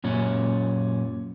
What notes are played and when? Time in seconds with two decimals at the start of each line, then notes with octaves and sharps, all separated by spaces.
0.04 F#2 A#2 C#4